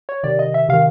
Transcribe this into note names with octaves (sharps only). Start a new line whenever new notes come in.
C#5
C3 D#3 D5
D#5
E5
C3 D#3 F5